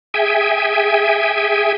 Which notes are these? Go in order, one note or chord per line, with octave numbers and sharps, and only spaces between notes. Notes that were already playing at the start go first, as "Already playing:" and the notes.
G#4 E5 G5 G#5